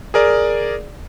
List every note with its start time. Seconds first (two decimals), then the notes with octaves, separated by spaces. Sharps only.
0.14 G#4 A#4 D5